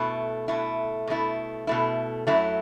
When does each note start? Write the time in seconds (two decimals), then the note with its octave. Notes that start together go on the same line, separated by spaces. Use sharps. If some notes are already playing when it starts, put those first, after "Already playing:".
Already playing: B2 A3 E4
0.48 B2 A3 E4
1.07 B2 A3 E4
1.67 B2 A3 E4
2.27 F#2 F#3 A3 E4